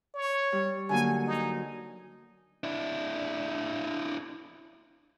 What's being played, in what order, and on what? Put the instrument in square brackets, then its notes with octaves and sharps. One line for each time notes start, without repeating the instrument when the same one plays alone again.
[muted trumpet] C#5
[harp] G3
[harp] D3 F#3 A#3 [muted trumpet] G#5
[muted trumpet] D#4
[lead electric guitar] D4 E4